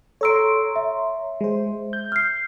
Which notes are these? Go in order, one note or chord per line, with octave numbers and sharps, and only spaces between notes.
A4 C#5 A#5 C6 E6 D7
E5
G#3 C5
G6
F6 C7